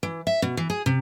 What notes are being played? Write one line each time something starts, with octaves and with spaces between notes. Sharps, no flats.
E3
E5
B2
E3
G#4
C3